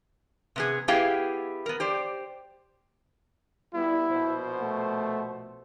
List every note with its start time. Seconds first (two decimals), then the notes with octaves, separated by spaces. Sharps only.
0.56 C3 B3 G#4
0.88 B3 E4 G4 G#4 F5 G5
1.66 B3 A#4
1.80 G4 C5 D5
3.74 G3 B3 E4
4.09 A#1 B2 C5
4.61 A3